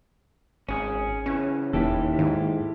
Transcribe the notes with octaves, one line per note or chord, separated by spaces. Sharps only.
G#1 C#4 G#4
C#3 E3 C#4
E1 D#2 E4 G4 A4
G#2 D#3